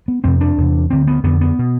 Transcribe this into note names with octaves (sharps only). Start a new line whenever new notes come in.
B3
F2 C3 C4
D4
E2 C3
D2 D3 C4
B3
F2 D3 B3
B3
B2